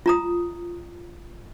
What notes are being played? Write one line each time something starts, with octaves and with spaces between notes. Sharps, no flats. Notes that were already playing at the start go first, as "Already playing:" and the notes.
F4 A#5 D#6